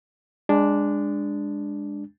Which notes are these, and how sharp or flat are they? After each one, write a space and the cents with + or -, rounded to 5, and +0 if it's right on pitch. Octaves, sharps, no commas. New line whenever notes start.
G#3 -20 D4 +0